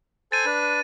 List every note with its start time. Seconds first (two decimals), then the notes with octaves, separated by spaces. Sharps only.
0.32 A4 C5 G#5 A6 D#7
0.45 D4 B4